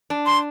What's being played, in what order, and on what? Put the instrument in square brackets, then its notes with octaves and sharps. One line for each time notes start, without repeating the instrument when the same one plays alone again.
[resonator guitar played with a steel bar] D4
[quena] C6